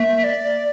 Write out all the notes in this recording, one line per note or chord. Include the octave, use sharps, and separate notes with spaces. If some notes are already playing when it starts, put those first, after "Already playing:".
Already playing: A#3 E5
D5